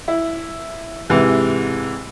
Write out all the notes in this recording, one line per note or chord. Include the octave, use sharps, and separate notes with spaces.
E4
G#2 C3 E3